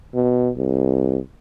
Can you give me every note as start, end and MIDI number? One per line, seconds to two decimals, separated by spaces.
0.14 0.50 47
0.57 1.19 36